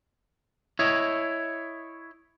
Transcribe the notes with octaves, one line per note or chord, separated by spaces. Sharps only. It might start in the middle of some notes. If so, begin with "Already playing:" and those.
E4 C#5 D#5